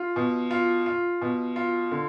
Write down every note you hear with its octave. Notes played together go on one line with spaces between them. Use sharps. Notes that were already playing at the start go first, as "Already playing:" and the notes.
Already playing: F4
B2
F4
F4
B2
F4
D3